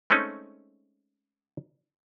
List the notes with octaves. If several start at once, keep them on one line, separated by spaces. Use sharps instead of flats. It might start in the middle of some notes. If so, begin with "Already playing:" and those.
G#3 A3 C4 C#4 D#4